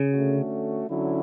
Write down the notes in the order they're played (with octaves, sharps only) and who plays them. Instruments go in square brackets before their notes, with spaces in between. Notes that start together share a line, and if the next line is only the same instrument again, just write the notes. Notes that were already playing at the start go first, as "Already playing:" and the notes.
Already playing: [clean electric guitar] C#3
[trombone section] D3 A3 C#4 F#4
D3 F#3 C#4 E4